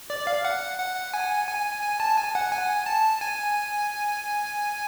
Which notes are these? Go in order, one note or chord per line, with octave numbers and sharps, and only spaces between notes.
D5
F5
F#5
F#5
G#5
G#5
G#5
A5
G#5
F#5
G#5
A5
G#5